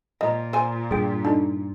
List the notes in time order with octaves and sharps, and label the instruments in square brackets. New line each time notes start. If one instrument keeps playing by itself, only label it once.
[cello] A#2 [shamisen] F3 [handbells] D#5 A#5
[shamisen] C5 G#5 [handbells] C6
[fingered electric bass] G2 [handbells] G#4 G5
[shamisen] A3 [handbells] D4 D#4